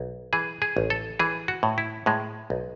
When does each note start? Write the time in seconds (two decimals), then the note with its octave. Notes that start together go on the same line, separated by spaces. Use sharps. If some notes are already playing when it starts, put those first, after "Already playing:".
Already playing: B1
0.33 E3 G#4
0.62 G#4
0.77 A1
0.90 A4
1.19 E3 G#4
1.48 F#4
1.63 A2
1.78 E4
2.06 A2 G#3
2.50 B1